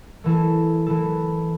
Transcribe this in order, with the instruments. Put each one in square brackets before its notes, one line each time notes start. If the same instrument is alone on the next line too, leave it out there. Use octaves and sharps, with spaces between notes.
[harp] E3 A3 E4 A4
E3 A3 E4 A4